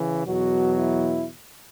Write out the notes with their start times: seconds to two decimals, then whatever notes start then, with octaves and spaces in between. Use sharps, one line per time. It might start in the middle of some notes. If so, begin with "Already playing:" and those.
Already playing: C#3 E3
0.26 E2 B2 F#3 F#4
0.78 E4